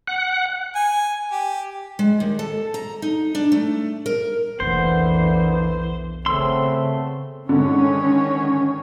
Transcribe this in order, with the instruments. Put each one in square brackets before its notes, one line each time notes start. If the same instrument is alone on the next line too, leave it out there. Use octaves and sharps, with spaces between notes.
[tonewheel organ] F#5
[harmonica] G#5
G4
[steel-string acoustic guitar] G#3
D#2
A4
A#5
D#4
D4
A3
A#4
[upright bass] F1 B1 [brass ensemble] D3 A#3 B3 [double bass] E3 [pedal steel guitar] C5
[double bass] C#3 [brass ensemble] A3 B3 C4 [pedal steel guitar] C6 E6
[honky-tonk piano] G#2 D3 [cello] D#3 C#5 [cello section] C#4